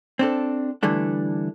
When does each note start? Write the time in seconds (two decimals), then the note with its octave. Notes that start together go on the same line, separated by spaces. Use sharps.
0.19 C4 D4 A4
0.83 D3 E3 G3 A3 D4